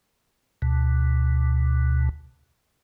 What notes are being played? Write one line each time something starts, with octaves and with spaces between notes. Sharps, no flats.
D2 B2